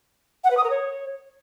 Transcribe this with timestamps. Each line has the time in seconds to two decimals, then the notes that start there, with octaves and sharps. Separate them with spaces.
0.44 F#5
0.50 B4
0.57 D#6
0.64 A#4
0.70 C#5